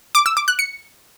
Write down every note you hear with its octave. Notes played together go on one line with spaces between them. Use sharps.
D6
E6
D6
F#6
C#7